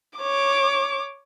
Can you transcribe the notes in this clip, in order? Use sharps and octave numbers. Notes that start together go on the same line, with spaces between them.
C#5 D6